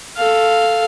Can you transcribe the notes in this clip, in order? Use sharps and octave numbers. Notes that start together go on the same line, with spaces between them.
A4 F5